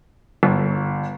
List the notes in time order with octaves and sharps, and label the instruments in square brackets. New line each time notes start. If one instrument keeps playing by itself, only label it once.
[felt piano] G1